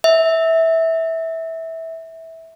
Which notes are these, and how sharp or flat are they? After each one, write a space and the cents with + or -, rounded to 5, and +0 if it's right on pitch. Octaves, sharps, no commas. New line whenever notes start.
E5 -15